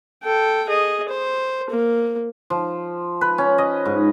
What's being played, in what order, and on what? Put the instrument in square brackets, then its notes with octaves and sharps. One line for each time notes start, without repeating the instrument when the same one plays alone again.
[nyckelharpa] A4 G5
G#4 D#5
C5
A#3
[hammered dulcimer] F3
B4
C#4
D#5
G#2